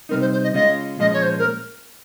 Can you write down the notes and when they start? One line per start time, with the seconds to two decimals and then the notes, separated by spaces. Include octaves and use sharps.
0.09 C3 G3 C4 D#4 A#4
0.21 C5
0.33 C5
0.44 D#5
0.54 C#3 G#3 C#4 F4 D#5
0.99 A#2 F3 G#3 C#4 D#5
1.13 C#5
1.22 C5
1.39 A#4